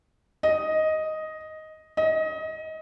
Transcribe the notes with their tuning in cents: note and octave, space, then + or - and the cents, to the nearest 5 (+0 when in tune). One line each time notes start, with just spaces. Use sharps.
D#5 +5
D#5 +25